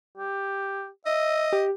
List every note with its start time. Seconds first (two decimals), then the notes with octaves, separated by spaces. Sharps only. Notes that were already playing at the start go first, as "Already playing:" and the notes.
0.18 G4
1.06 D#5 E5
1.53 G4